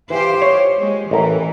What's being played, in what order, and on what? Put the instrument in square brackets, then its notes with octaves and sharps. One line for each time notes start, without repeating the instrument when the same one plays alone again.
[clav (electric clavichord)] E3 [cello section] F4 G4 C5
[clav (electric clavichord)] C#5
[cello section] G#3
[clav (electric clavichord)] A1 A#4 [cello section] E3